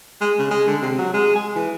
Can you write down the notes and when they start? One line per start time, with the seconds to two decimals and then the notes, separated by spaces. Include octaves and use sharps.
0.21 G#3
0.39 C#3
0.51 G#3
0.67 D3
0.82 C3
0.98 F#3
1.14 G#3
1.35 G#4
1.56 E3